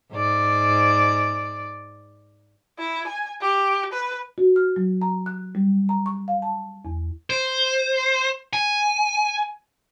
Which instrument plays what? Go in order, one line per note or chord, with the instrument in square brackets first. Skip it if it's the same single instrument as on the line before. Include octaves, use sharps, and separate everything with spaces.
[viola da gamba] G#2 D5
[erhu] E4
G#5
G4
B4
[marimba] F#4
F6
F#3
A#5
F#6
G3
A#5
C#6
F5
A5
E2
[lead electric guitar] C5
G#5